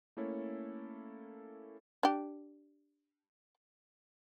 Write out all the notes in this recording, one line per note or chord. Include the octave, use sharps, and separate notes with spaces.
A3 A#3 C#4 E4 A4 C#5
D4 G4